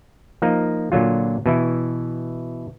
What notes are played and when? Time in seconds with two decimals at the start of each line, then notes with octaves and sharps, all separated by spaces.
0.42 F3 A#3 D#4
0.92 A#2 D3 F#3 F4
1.46 B2 E3 E4